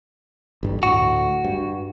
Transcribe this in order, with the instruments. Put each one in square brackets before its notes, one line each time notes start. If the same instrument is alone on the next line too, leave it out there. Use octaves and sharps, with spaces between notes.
[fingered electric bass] A1 G2 G3
[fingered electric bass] D2 A2 [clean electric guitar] F#4
[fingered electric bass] G2